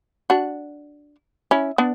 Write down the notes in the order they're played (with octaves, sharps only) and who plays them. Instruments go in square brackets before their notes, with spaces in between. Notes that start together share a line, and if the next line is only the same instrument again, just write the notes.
[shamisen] D4 F#4
C#4 E4
B3 D4